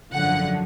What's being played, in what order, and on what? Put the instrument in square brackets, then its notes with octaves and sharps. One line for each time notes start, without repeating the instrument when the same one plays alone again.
[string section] G#1 F#2 D3 F3 F#5